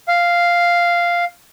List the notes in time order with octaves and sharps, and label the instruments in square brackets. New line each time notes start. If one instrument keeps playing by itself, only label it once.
[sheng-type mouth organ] F5